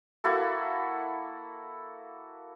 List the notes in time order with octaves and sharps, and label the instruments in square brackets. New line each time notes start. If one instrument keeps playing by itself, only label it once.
[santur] A#3 E4 F#4 A4